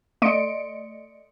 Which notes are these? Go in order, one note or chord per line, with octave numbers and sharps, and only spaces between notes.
A3 D5 D#5 C6 C#7 D7